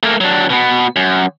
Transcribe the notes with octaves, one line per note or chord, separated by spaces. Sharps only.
A3 A#3
F#3 D4
B2 B3
F#2